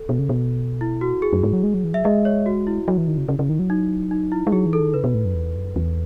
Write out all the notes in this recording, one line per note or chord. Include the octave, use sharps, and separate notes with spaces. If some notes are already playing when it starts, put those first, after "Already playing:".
Already playing: A4
B2
C#3
B2
E4
F#4
G#4
F#2
G#2
F#3
G#3
F#3
E3
F#3 E5
G#3 D#5
C#5
F#4
E4
F#3
E3
D#3
C#3
C#3
C#3
D#3
F#3
D#4
D#4
E4
G#3
F#3 G#4
E3
A4
D#3
C#3 B4
B2
A2
F#2
E2
F#2
E2